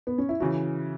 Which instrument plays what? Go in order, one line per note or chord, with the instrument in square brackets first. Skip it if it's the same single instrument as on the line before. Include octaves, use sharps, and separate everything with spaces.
[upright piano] B3
C#4
E4
[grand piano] C#3 E3 [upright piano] F#4